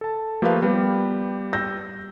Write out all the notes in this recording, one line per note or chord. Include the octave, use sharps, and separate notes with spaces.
A4 A5
F3 A3 A#3 G4 B4 F5
G3 B3 G4
E6 G6 A#6